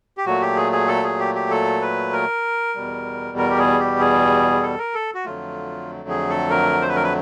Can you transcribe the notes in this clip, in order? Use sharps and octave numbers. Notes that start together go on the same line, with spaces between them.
G4
A#2 F#3 A3 F#4
G4
G#4
G#4
A4
G#4
G4
G4
A4
B4
A#4
E2 B2 G3
A#4
G4
G#4
G4
G#4
A4
A#4
A4
F#4
F2 D3 F#3 A3 F4
G#4
A4
A#4
C5
B4
A#4
B4